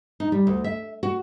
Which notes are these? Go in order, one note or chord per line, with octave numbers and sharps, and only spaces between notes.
D#4
G3
D2
E5
F#4